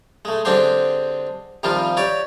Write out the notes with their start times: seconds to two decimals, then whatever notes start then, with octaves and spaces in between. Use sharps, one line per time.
0.25 G#3 A3
0.45 D3 G#3 C4 D4 G4 C5
1.63 C3 D#3 F3 G3 F4
1.97 G4 C#5 D5